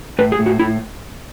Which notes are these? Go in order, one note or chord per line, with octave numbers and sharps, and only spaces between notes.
A2 B4
G#4
A2
F#4
A2 E4